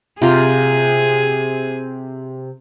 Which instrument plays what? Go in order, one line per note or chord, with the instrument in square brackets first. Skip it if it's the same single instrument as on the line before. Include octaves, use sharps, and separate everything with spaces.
[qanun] C3 F4 A#5 [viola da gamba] G#4